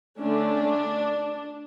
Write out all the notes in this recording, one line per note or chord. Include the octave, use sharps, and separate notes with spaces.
D3 A3 C#4 D4